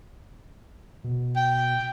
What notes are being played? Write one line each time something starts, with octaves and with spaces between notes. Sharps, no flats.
B2
G5